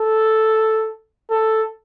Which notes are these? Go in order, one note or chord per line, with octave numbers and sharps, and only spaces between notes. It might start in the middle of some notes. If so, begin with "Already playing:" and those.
Already playing: A4
A4